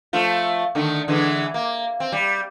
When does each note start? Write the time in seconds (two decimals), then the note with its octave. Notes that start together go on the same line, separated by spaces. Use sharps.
0.13 F3 A3 F4
0.75 D3 D#3 A3
1.08 D3 E3 G#3
1.54 A#3
2.00 C4
2.12 G3